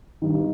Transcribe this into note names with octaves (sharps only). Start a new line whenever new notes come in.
G2 D#3